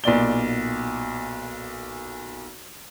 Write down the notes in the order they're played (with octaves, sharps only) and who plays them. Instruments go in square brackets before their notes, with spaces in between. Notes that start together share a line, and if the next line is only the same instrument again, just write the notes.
[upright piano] B1 A#2 D5 G7